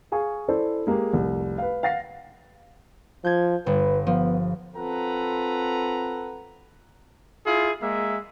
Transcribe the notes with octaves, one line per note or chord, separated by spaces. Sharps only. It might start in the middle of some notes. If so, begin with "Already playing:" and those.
G#4 F5 G#5 C#6
E4 A4 C5 D5
G#3 A#3 G4 G#4
F1 C2
B4 F5
F5 F#5 A6 A#6 C7
F3 G6 G#6
G1 B4
F3 B3
C4 F4 A4 B4 F#5 A#5
E4 F4 G#4
G#3 A#3 E5